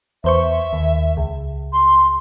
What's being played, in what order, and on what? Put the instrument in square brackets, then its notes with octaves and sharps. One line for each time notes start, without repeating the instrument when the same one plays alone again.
[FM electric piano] E2 C5 C#6 [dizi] E5
[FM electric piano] D#2
C#2
[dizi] C6